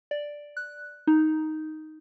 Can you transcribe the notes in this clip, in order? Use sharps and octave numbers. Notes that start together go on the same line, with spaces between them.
D5
F#6
D#4